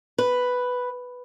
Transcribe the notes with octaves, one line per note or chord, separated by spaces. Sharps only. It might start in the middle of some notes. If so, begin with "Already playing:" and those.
B4